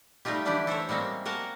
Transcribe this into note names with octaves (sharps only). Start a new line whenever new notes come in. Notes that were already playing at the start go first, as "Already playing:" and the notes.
G3 A3 D#4 F4 G4
D3 E3 D4 E4 G4 D5
A4 C5 C#5 E5
G3 G#3 A#3 C4 C#4
A#3 F#4 A#4 F5 A5